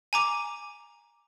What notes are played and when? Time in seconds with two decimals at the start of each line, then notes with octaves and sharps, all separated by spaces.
0.13 G#5 A#5 D6